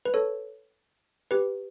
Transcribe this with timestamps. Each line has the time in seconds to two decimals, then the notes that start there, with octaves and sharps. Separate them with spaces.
0.05 B4
0.14 A4 C#5
1.31 G4 B4